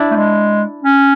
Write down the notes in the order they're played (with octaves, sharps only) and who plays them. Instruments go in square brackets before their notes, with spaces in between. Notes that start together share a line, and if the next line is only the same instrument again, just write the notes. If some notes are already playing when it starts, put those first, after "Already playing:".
Already playing: [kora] D4 E4
[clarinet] A3
G#3
C#4